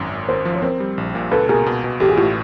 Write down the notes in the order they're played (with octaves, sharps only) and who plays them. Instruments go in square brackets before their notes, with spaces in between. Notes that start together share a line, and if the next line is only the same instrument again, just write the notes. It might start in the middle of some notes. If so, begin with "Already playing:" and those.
Already playing: [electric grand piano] G#1 F#2
G#1
[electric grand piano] G#1 [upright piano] A#4 C5
[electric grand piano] F3
[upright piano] C#5
[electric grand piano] C4 [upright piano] A#4 C5
[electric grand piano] G3
A#1
A#2
[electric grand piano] C#2 [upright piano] A4 B4
[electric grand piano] B2 [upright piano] G#4 A#4
[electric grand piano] B2
B2
[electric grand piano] A1 [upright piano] G4 A4
[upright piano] F#4 G#4
[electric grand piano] A2 [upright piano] F4 G4